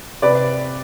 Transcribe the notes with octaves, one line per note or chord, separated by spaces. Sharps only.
C3 B4 D5